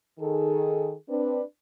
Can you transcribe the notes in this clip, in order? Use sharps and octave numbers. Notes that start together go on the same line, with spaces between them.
D#3 G#4 A4
C4 D4 B4